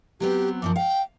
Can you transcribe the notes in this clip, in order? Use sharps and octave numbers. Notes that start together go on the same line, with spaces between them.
F#3 B3 C4 G4
F#2 D#3 F3 D6
F5 G5